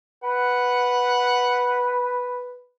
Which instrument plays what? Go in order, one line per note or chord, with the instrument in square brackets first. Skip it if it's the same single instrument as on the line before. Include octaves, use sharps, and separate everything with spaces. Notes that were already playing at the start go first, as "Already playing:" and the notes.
[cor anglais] B4 [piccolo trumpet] F#5